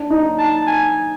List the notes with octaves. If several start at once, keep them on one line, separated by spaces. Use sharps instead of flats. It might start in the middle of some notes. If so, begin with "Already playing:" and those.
Already playing: D4
D#4
A5
G#5